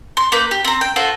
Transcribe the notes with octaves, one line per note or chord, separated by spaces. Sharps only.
C6
A#3 B4 G6
G4
C4 A#5
G5
F4 F#4 A4 C5